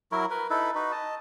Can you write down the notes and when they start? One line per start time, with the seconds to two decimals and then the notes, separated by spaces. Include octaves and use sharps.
0.12 F#3 E4 F#4 A#4
0.30 A#4 B4
0.50 D#4 E4 A4 B4
0.75 D#4 F#4 B4
0.92 D#5 A5